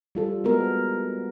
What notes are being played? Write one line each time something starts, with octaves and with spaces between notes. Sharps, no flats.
G3 F4 A4
G#3 A#3 B3 F#4 A#4